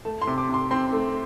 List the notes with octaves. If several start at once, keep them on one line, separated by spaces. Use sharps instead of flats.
A3 A5
C6
C3
D6
C3 C6
C4 C6
A3